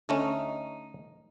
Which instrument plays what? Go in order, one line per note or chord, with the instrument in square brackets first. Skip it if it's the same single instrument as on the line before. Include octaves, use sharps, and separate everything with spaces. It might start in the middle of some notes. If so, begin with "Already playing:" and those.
[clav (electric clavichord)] D2 A3 C#4 [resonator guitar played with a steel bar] D#4